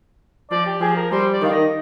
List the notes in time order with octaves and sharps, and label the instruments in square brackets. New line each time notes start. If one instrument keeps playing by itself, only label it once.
[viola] F3 [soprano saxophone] D5
[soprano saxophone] G4
[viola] F3 [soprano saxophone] G#4
[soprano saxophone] A#4
[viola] G3 [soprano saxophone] C5
[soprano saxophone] D5
[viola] D#3 [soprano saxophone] F5
[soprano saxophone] D#5